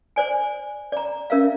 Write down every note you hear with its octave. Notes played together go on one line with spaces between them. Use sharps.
C5 D5 G#5
D5 A#5
C#4 A#4 E5 F5